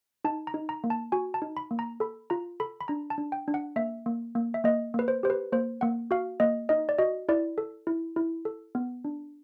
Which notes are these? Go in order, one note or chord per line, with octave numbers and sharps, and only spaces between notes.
D#4 A5
A#5
D#4
A#5
A#3
A5
F#4 G#5
A5
D#4
B5
A#3
A#5
A4 B5
F4 A#5
A4 B5
B5
D4 A#5
A5
D4
G5
D4
F#5
A#3 E5
A#3
A#3
E5
A#3 D#5
A#3 B4
C5
G4 C5
B4
A#3 C5
A#3 F#5
F#4 F5
A#3 D#5
D#4 D#5
D5
F#4 D#5
E4 D5
A4
E4
E4
A4
B3
D4